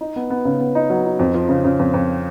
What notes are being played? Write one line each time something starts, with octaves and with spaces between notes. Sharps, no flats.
D#4
B3
B3
C#3
B3
D#4
F#3
D#4
F2
F3
C#3
C#3
F2
F2